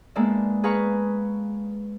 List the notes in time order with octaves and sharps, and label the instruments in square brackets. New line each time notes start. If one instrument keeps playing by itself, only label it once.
[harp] G#3 A#3 B3 D4 E5
G#4 B4 F5 A#5 C#6